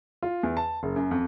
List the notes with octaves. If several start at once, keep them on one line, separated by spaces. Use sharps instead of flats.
F4
E2
A5
F#1
F#2
F2